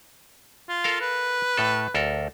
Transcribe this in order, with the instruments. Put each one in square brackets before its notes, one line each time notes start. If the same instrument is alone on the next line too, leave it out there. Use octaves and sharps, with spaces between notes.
[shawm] F4
[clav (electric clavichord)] A4 A#4 F5
[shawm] B4
[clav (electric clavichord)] A2 A4
D2 A4 A#4